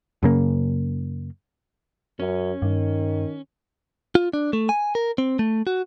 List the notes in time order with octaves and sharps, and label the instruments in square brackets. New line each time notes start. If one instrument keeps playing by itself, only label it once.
[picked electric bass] F#2 C#3 A#3
[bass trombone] F#2 [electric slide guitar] C#4
[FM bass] G2 [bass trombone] D#3
[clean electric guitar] F4
D4
A3
G#5
A#4
C4
A3
F#4